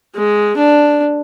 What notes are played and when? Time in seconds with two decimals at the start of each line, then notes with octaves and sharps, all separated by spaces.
0.15 G#3
0.57 D4